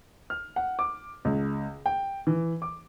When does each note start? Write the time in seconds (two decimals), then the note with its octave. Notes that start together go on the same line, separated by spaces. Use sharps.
0.30 F6
0.56 F#5
0.79 D6
1.25 C#2
1.86 G5
2.27 E3
2.62 D6